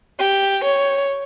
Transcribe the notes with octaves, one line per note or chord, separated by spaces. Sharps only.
G4
C#5